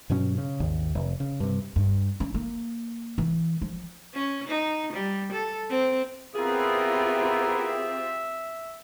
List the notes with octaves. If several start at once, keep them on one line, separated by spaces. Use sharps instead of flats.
G2 B2 F#3 C#4
C#3
G#1 D#2
F1
C#3
G2 C3
G2
C#4
A#3
E3
F3
C#4
D#4
G3
A4
C4
B3 C4 E4 F4 G4 G#4 A#4 E5